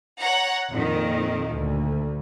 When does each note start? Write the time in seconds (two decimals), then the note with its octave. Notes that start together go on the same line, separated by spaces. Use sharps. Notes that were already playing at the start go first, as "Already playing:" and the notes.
0.19 C#5 F#5 A#5
0.69 F2 A#2 D#3
1.51 D2